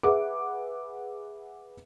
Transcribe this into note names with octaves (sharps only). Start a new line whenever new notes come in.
G#4 B4 E5 F#5 D6